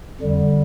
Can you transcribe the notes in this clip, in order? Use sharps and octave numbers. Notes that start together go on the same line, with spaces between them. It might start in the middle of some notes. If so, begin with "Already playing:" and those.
F2 D3 G3